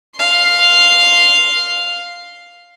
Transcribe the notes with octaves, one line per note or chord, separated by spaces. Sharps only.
F5 C6